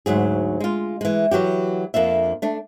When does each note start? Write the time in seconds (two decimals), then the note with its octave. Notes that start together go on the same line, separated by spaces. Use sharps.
0.06 D2 G#2 F#3 G#4
0.60 G#3 F4
1.01 E3 G#3
1.31 E3 F#3 F#4 G4
1.94 F2 A#3 D4 E5
2.42 A3 D4